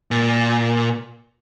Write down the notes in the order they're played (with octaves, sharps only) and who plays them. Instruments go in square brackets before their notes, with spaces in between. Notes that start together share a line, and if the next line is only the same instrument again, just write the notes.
[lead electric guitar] A#2